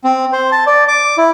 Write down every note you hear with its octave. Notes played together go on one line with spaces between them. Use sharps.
C4
C5
A5
D5
D6
E4